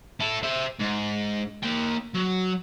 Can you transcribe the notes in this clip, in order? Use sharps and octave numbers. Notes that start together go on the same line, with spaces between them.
E4 A4
C5 E5
G#2
A#3 G5
F#3